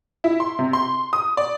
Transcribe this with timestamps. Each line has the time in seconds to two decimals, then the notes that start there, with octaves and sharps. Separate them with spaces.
0.24 E4
0.40 C6
0.59 C3
0.73 C6
1.13 D#6
1.37 D5